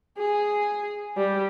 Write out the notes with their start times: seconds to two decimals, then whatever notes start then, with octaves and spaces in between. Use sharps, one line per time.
0.18 G#4
1.17 G3